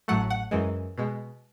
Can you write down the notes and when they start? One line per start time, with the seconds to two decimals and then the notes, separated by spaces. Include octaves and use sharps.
0.08 A1 A2 F#3 A3 F#5
0.30 F#5
0.51 F#2 E3 G#3
0.98 B2 G#3